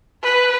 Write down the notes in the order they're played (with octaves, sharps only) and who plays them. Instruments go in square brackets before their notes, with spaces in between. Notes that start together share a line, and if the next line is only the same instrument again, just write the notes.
[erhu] B4